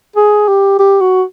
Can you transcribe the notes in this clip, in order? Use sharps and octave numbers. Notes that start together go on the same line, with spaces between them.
G#4
G4
G4
F#4